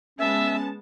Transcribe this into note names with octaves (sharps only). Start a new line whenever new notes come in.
G#3 B3 C#4 E5 A5